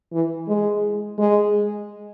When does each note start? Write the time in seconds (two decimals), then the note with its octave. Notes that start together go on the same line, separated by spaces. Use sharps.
0.13 E3
0.48 G#3
1.18 G#3